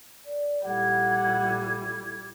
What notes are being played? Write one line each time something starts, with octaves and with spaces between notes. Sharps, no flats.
D5
A#1 G3 E4 A4 F#5 G#6